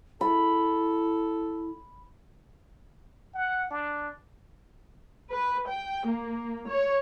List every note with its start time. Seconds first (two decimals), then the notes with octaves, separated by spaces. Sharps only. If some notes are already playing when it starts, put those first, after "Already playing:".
0.21 E4 A4 B5
3.34 F#5
3.71 D4
5.30 B4
5.71 G5
6.08 A#3
6.69 C#5